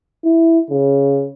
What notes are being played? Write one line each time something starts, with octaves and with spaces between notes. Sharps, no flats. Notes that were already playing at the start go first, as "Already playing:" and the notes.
E4
C#3